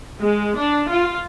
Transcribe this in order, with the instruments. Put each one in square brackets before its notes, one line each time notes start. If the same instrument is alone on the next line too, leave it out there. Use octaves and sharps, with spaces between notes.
[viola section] G#3
D4
F4